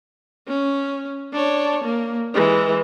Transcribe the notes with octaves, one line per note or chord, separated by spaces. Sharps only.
C#4
D4 C#5
A#3
E3 G#3